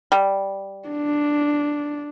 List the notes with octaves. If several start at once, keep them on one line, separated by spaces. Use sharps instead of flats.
G3
D4